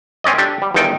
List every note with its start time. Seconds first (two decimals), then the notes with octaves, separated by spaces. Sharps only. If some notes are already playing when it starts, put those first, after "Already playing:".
0.24 C4 C#4 D5 D#5
0.38 D4 G4 A4
0.62 G3
0.74 G1 E2 D#3 D#4 A4 G5